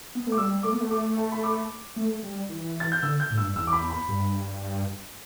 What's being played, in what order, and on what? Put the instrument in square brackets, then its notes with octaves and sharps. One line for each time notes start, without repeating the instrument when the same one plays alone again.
[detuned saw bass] B3
A3
[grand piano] D6
[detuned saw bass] G3 [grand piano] E6
[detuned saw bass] A3 [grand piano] D6
[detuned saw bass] B3
A3
[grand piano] D6
A5
B5
D6
[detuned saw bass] A3
G3
E3
[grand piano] A6
G6
[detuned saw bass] D3 [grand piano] E6
[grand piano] G6
[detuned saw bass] A2
[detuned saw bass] G2 [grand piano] E6
[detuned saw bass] E2 [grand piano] E6
[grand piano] D6
B5
B5
[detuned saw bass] G2